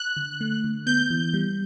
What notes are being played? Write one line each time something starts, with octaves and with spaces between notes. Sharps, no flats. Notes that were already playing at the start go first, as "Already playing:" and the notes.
Already playing: F#6
D3
A3
D3
B3 G6
E3
G3